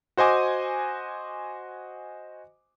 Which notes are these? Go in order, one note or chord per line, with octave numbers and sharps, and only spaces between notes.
F#4 C5 D#5 G#5 D6